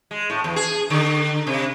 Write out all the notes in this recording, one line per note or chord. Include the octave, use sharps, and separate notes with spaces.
G#3
A2
E2
G#4
D3
C3